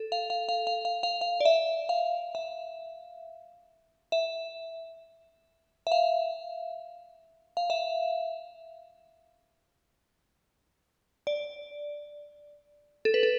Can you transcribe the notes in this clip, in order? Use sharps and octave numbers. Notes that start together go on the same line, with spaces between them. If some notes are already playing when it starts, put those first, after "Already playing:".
Already playing: A4
F5
F5
F5
F5
F5
F5
F5
D5
E5
F5
E5
E5
E5
F5
F5
E5
D5
A4
B4
A4